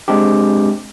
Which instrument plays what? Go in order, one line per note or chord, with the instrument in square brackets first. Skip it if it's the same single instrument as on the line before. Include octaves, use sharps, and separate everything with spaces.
[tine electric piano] G#3 C4 D4 G4